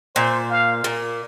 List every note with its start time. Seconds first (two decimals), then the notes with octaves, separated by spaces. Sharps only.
0.15 A#2 C5
0.50 F5
0.84 A#2